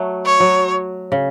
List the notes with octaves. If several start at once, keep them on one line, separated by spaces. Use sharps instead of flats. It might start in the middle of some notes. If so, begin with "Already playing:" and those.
Already playing: F#3 A3
C#5
F#3
C#3